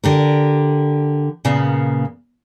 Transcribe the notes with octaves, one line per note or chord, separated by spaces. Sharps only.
D3 G4 A#4
A#2 C#3 A#3 B3